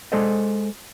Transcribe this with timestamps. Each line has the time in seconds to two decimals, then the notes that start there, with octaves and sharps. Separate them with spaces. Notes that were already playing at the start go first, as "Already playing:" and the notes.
0.12 G#3 A4 C5 D5 D#5